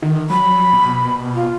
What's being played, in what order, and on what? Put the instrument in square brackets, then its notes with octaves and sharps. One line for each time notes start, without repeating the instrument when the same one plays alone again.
[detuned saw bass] D#3
[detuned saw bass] F#3 [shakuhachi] B5
[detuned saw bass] B2
[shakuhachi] F4